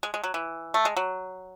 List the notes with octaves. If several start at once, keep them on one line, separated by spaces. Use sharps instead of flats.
G#3
G#3
F#3
E3
A3
G#3
F#3